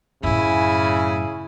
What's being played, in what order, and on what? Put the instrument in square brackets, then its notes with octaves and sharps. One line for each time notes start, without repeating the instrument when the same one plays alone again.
[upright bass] F#2 A2 [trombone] C#3 [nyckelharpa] E4 G#5